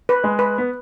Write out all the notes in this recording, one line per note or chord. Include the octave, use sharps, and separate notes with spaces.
B4
G#3
B4
B3